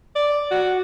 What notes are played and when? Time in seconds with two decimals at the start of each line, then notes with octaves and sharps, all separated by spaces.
0.16 D5
0.51 F#4